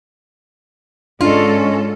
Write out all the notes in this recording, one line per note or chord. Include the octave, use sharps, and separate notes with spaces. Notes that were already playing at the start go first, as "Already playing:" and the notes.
G#2 C#4 D4 F4 A4 D#5